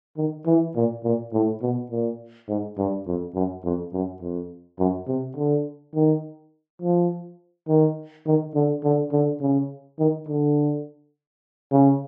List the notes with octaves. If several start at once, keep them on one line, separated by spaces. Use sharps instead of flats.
D#3
E3
A#2
A#2
A2
B2
A#2
G#2
G2
F2
F#2
F2
F#2
F2
F#2
C3
D3
D#3
F3
D#3
D#3
D3
D3
D3
C#3
D#3
D3
C#3